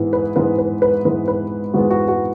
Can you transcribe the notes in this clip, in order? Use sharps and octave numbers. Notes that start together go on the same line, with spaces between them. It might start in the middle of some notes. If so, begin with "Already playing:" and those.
Already playing: G#2 E3 G#3 B3 E4
B4
G#2 E3 G#3 B3 B4
B4
B4
G#2 E3 G#3 B3 B4
B4
G#2 E3 G#3 B3 F#4
F#4
F#4